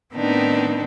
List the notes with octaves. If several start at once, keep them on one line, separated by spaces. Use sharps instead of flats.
A2 D#3 B3 C4 D4 D#4